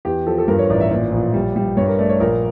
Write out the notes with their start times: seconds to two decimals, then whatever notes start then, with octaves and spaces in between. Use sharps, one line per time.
0.05 E2 G4
0.27 F3 A4
0.38 A4
0.48 G2 A#4
0.59 C#5
0.70 A1 D5
0.81 E5
0.91 A#2 D5
1.12 A#1
1.34 G3
1.56 G3
1.77 G2 C#5
1.88 A#4
1.99 A3 D5
2.09 C#5
2.20 A#1 A#4